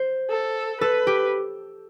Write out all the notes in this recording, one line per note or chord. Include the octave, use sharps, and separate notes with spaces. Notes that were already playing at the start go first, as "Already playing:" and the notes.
Already playing: C5
A4
A4 B4
G4